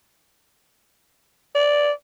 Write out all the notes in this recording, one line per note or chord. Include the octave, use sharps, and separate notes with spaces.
D5